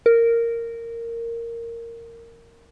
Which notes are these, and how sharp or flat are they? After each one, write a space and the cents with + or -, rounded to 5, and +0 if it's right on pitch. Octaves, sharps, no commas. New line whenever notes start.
A#4 -10